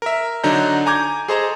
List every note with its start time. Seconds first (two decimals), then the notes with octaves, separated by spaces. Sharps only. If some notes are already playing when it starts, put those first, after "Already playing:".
0.02 A#4 E5
0.43 D3 F#3 D4 D#4 A#5 G6
0.86 G#5 A#5 D6 G6 G#6
1.28 G#4 A4 C5 D#5 A5 A#5